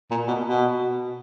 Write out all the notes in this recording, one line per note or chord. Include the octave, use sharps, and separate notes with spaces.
A#2
B2
B2